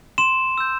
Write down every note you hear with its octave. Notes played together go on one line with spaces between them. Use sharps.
C6 E7
E6 G6